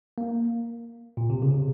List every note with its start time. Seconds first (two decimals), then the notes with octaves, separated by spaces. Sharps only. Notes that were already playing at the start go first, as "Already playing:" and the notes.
0.18 A#3
1.17 A#2
1.30 C3
1.42 C#3
1.54 C3